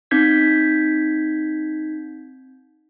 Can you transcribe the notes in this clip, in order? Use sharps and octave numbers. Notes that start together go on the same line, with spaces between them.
C4 D#4 G6 G#6 B6